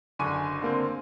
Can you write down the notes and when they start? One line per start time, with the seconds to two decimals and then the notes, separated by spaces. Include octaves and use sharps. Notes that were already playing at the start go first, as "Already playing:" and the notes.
0.19 F#1 D3 G#5 C#6 D6 D#7
0.62 D3 A#3 C4